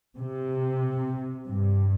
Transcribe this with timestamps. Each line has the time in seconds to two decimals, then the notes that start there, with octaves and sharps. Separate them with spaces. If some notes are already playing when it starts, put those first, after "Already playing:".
0.17 C3
1.48 G2